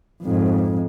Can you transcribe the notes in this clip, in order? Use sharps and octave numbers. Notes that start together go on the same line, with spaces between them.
F2 G#2